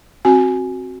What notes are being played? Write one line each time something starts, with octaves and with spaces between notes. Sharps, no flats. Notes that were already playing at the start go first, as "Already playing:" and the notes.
C4 F#4 G#5